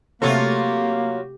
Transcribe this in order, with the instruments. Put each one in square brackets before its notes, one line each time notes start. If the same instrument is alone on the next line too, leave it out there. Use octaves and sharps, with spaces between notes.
[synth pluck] C3 A3 [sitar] F#3 F4 C#5 [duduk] A#3 [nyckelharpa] G4